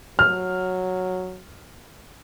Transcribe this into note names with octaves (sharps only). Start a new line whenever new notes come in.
F#3 F6